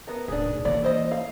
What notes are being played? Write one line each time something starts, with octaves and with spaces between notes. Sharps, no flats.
B3 A#4
D1 D4 G#4
B1
E3 A#3 F#4 D5
E4 C5 D#5
F5